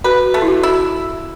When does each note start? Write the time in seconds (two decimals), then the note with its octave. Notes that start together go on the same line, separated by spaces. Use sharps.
0.04 F#4 B4
0.34 A3
0.42 E4
0.48 F#4
0.63 E4